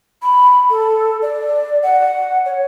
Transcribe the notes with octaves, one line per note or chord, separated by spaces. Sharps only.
B5
A4
D5
F#5
C#5